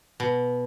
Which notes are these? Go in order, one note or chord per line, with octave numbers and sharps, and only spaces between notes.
B2